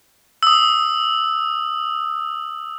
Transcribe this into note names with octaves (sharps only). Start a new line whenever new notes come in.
D#6 E6